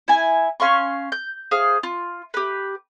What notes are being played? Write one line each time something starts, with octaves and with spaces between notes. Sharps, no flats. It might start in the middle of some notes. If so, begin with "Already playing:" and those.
E4 G#5
C#4 F5 C6 C#6
G6
G#4 C5 F5
F4
G4 B4